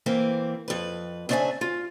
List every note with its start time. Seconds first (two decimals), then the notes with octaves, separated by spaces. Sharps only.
0.06 E3 A#3 C4
0.68 F2 B4
1.29 C#3 C4 D4 D5 E5 G#5
1.61 F4